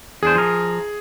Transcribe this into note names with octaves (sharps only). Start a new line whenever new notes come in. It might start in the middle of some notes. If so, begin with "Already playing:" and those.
E2 D4 G#4 C5
F3 A#4